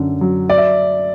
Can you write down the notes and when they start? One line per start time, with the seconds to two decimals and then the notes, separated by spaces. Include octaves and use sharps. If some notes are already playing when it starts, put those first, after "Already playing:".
Already playing: F#2 D3
0.21 F#3
0.49 D5
0.58 E5